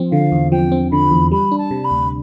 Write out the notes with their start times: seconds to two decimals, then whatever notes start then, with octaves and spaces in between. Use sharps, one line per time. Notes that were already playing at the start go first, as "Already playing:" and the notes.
Already playing: F3 C4
0.12 D3 F5
0.32 E2
0.52 F3 G5
0.72 C4
0.91 D3 B5
1.11 E2
1.31 G3 B5
1.52 D4
1.58 A5
1.71 C3
1.84 B5
1.91 D2